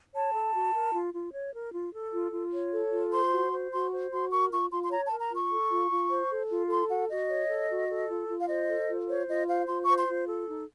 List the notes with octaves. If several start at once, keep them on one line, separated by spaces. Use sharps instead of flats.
C#5 A5
A4
F#4
A#4
F4
F4
C#5
A#4
F4
A4
F4
F4
C#5
A4
F4
C5 C6
F#4
C5
F#4 C6
C5
F#4 C6
A#4 C#6
F4 C#6
F4 C6
C6
C#5 A#5
A5
A#4
A#5
F4 C#6
A4
F4
F4
C5
A4
F4
A4 C6
F#4 F#5
F#4 D#5
C#5
A4
F#4
A4
F4
F4
F5
C5 D#5
A4
F4
C5 C#5
F4 D#5
C5 F5
F4 C6
C#6
C5
C6
F4
A4
D#4